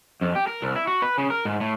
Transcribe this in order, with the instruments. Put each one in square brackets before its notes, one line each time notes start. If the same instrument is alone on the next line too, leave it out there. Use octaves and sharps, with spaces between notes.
[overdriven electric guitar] F2
G4
A#4
C2
E4
F#4
B4
C#3
A#4
G#2
A2